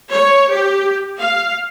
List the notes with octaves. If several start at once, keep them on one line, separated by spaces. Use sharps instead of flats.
C#5
G4
F5